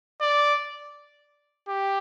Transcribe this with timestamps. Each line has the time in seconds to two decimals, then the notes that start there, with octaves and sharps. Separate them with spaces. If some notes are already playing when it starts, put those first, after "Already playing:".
0.21 D5
1.68 G4